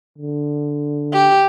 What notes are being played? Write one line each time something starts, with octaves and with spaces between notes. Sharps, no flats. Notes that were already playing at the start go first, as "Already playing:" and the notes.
D3
G4